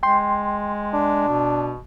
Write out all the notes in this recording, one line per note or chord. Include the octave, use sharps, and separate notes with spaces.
G#3 G5 C6
D4
B2